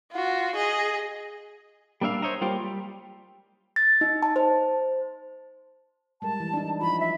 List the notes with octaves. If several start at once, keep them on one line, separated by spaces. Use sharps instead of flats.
F4 F#4
G#4 D#5
G3 A#3 D4 E5 F5
C5 C#5 D#5 E5 A#5
G3 A#3 F4 G4 C5
G3
A6
D#4
A5
C5
G3 G#3 A#4 A5
E3
D4 D#4
F3 E4 F4 B5
E5